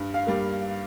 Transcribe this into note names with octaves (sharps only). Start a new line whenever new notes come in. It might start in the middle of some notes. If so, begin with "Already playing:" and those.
Already playing: G2
F5
G3 A#3